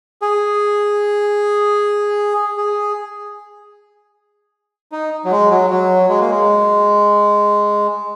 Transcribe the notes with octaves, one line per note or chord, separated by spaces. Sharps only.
G#4
G#4
D#4
F#3
G#3
F#3
F#3
G#3
A#3
G#3